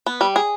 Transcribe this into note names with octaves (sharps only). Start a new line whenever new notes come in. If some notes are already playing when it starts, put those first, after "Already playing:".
B3
G3
G#4